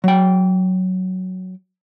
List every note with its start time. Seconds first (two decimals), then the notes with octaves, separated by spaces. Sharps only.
0.04 F#3 G5